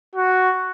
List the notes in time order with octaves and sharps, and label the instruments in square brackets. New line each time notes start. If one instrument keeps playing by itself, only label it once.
[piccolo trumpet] F#4